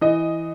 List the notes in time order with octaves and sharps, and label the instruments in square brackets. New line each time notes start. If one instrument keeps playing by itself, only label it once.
[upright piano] E3 D#5